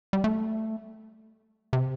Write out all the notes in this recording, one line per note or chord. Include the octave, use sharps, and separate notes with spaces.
G3
A3
C3